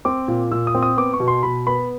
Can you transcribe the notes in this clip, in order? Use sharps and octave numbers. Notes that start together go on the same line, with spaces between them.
C4 D6
A#2
A#2 E6
D#6
C4
D#6
B3 D6
C#6
B2
C6
B2 B5
B3 B5